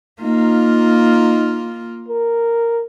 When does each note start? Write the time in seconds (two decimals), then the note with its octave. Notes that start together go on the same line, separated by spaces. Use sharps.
0.22 A#3 D#4 F4
2.09 A#4